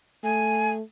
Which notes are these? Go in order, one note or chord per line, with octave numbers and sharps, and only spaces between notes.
A3 G#5